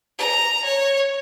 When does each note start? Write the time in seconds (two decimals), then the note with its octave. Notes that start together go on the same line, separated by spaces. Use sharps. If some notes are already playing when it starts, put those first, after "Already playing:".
0.18 A#5
0.64 C#5